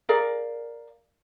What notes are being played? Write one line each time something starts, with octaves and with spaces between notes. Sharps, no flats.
G#4 A#4 D5 F5